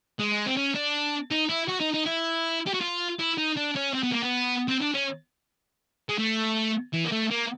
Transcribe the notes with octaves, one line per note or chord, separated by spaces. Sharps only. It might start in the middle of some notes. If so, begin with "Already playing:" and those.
G#3
C4
C#4
D4
D#4
E4
F#4
D#4
D#4
E4
G4
F#4
F4
E4
D#4
D4
C#4
C4
B3
A#3
B3
C4
D4
C#4
G#3
A3
E3
A#3
A3
A#3